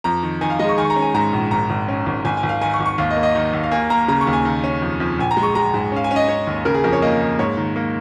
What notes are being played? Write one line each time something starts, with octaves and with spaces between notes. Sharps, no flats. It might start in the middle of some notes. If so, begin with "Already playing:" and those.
F2 A#5
D#3
D#3 G#5
F5
G#3 D#5
C#6
D#3 G#5
C#6
A#5
C#4
G#5
G#2 A#5
A#1
G#1 A#5
G#1
C#4
G#1
G#1 G#5
G#5
G#1
F5
D#3 G#5
C#6
G#1
C#6
D#2 F5
D#5
A#3
D#5
D#3
D#2
F5
A#3 G#5
A#3 A#5
C#3 A#5
C#6
D#2
G#5
D#3
C#4
F2
F2
A#1 G#5
A#5
G#3
C#6
G#3 A#5
G#2
C#4 F5
G#5
C#4
D#5
C#4 C#5
D#2
C#3 A#4
G#4
F2 A#4
C#5
A#3 D#5
A#3
G#2 C#5
D#3
A#3